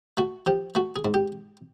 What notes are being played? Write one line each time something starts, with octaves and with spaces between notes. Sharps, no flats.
A3 F#4
F3 G4
A3 F#4
G#4
G#2
G4